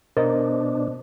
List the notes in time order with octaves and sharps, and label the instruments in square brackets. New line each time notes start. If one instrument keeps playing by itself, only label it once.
[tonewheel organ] B2 D4 [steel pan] A#4 [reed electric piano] C5 D#5